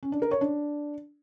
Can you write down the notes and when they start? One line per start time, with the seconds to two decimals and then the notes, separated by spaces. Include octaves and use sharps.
0.03 C#4
0.12 D4
0.22 A#4
0.31 C#5
0.41 D4